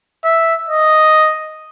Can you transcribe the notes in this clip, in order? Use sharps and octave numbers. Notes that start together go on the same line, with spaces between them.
E5
D#5